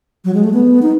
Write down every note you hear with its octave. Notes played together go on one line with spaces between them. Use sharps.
F#3
G#3
A3
B3
D#4